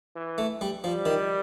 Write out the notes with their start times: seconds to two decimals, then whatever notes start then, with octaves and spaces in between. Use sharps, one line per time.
0.16 E3
0.38 A3
0.61 G3
0.84 F3 G3
1.06 D#3